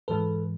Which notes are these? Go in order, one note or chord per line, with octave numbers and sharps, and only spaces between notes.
G#2 E3 G#3 A4 B4